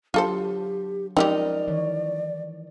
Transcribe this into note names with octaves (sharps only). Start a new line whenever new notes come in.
F#3 D4 F4 G4 A4 C5
F3 G#3 C4 C#4 D#4 G4 A#4 D5
D#3 E3 C#5